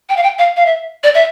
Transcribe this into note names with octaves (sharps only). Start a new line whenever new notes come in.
G5
F5
G5
F5
F5
E5
D5
E5